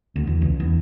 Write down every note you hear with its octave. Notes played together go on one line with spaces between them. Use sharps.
D2
E2
C#2
E2